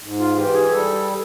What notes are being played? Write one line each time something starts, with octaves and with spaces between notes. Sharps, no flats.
G#2
F4
E3 G4
G#4
G3 A4